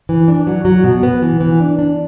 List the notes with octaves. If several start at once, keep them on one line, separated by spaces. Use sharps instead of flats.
E3
D4
F#3
F#3
B2
B3
E3
E3
D4
D4